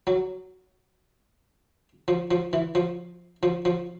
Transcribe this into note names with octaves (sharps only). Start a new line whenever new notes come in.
F#3
F3
F3
E3
F3
F3
F3